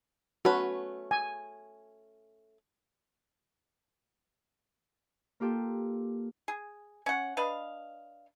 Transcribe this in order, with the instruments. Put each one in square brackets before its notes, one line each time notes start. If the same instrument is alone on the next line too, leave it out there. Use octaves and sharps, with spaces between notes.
[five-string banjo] A3 C#4 B4 [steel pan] F#4
[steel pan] G#5
[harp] A#3 F4 G4 A4
[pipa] G#4
C#4 F#5
D4 B4 D#5 F5